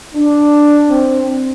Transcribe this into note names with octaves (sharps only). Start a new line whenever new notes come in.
D4
C4